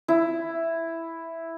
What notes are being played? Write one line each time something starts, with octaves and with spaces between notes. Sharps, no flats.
E4